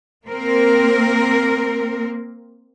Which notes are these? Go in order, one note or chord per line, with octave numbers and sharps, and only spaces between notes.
A#3 C4 A#4